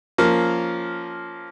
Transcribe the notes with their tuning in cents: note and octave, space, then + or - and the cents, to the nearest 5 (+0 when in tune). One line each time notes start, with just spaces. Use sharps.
F3 +0 A#3 -5 C#4 +10